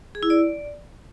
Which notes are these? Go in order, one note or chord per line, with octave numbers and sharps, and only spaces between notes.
G#4
E4
D5